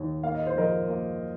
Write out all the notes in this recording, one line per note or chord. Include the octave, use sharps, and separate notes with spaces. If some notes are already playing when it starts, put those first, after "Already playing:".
Already playing: D#2
A#3 F5
D#5
C5
F3 A#4 D#5
A#3